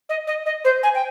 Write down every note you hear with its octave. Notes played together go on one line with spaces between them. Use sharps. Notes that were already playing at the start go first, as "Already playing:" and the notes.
D#5
D#5
D#5
C5
G#5
G5